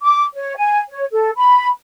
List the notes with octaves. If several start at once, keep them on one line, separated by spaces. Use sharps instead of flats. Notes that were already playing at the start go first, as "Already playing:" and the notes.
D6
C#5
G#5
C#5
A4
B5